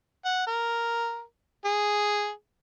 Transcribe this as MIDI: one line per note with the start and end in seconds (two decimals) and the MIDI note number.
0.25 0.43 78
0.47 1.22 70
1.65 2.30 68